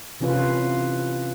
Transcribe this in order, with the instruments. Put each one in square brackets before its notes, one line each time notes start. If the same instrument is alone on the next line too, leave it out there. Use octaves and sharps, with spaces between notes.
[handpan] C3 E3 C#4 F4 B4